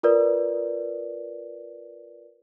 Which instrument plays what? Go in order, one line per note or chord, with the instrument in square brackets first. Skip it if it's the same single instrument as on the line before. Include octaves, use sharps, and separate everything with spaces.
[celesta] F4 A#4 B4 D5